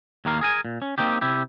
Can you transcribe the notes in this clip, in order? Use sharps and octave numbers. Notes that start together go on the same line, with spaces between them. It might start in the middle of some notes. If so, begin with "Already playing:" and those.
D#2 A2 D#3 A#3 A#4 F5
G#4 A#4 G#5
A#2
C#4
A#3 C4 D#4 G4
C3 E4 G4